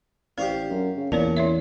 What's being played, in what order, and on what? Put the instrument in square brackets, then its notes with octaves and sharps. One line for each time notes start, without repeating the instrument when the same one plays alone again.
[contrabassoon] A1 [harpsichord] G4 C5 F5 [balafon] D5
[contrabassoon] F#2
C#3
[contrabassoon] A1 [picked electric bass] E2 [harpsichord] A#2 [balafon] C#5 D5 A5
[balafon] E4 C#5 E5